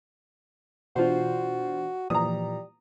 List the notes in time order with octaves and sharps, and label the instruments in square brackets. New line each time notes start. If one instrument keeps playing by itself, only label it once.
[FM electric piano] B2 E3 D4 [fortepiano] F4 C5 [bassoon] F#4
[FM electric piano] A#2 E3 F3 [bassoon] G3 [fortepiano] A#5 D#6